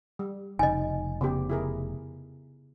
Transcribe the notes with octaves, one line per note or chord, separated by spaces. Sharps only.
G3
F1 C#3 D#4 D#5 G#5
C#3 B3 G4
E4 G#4 A#4